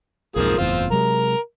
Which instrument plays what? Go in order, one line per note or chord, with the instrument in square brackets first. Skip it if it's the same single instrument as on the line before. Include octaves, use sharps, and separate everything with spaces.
[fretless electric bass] B1 F2 G#2 [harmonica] F3 A#3 G#4
[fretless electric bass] F#1 E2 A2 [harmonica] C4 F4
[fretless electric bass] C3 F#3 G#3 [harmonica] A#4